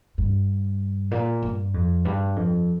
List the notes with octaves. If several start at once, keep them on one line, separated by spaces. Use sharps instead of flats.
G2
A#2
G2
F2
G2
F2